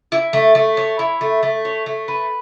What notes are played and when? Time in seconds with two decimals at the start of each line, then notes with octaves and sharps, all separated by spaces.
0.12 E4
0.33 A3
0.55 A3
0.77 C#5
0.99 E4
1.21 A3
1.43 A3
1.65 C#5
1.86 A3
2.08 B4